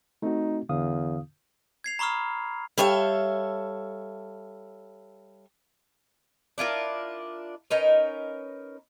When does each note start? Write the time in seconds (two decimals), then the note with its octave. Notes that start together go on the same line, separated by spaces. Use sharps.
0.23 A3 C4 D#4 F#4
0.69 E2 D3 F5 D#6
1.84 G#6 C7 F7
1.99 A#5 B5 C#6 D#6 F6
2.78 G3 A4 C#5 E5 F5
6.58 D4 E4 F4 A#4
7.70 C#4 D#4 A#4 B4